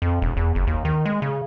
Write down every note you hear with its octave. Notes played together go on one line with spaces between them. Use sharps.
F2
E1
E2
F#1
D#2
D#3
G#3
C#3